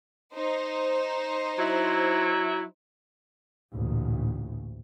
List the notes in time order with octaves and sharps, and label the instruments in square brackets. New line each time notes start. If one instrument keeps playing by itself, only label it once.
[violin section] D#4 C5
[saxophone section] F#3 E4
[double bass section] A1 D2 A#2